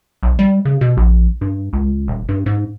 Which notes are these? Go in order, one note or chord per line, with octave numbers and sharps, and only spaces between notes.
B1
G3
C#3
B2
A#1
G2
C#2
D#1
G2
G#2